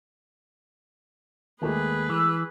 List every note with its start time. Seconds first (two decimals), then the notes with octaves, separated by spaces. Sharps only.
1.62 D#2 G#3 A3 G#4 A#4 B4
2.10 E3 E6